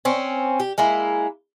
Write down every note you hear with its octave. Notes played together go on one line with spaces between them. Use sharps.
C4 C#4
G4
G#3 A#3 E4